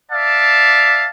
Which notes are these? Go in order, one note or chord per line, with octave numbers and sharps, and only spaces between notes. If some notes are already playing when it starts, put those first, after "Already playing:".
D5 E5 F5 A5